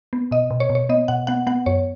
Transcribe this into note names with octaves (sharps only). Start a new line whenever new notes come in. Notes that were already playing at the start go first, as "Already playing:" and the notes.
B3
B2 D#5
B2
C#5
B2
C#5
B3 D#5
B2 F#5
B3 F#5
B3 F#5
F#2 C#5